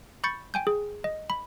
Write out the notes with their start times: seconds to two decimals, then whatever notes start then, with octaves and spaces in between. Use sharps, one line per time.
0.24 B5 C#6 G6 A6 C#7
0.54 G5 G#5 G6
0.67 G#4
1.04 D#5
1.30 B5